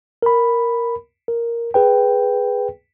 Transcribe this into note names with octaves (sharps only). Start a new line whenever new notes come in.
A#4 B5
A#4
G#4 B4 G5